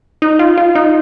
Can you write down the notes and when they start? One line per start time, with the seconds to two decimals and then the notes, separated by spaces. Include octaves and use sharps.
0.22 D#4
0.39 F4
0.57 F4
0.75 D#4